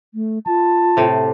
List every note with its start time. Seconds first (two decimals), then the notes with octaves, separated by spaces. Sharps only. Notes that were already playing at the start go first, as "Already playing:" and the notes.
0.14 A3
0.47 F4 A5
0.97 A2 C3